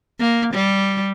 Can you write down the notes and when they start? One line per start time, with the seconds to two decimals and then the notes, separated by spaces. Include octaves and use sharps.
0.20 A#3
0.54 G3